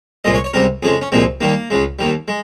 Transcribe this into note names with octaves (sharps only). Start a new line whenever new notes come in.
C2 A#2 G#3 D#5
C#5
C#5
C#2 C3 G3 A#4
F2 C#3 G#3 G#4
C#4
C2 A#2 F3 G#3 C4
D#2 D#3 G3 A#3
C#2 C#3 G#3
D#2 D#3 G3
G#3